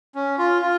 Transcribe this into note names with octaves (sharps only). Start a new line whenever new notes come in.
C#4
F4
F4